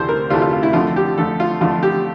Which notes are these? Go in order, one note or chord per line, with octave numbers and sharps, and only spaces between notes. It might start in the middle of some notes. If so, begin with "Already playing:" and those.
Already playing: D2 C3 E3 A3 C5
A#4
D2 C3 E3 A3 F4
F4
F4
E4
F2 D3 A3 F4
G4
F2 D3 A3 A4
F4
F2 D3 A3 F4
G4